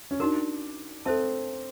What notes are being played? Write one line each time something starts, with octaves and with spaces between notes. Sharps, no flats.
C#4
D4 D#4 F#4 A#4
C4 A4 C5 E5 A5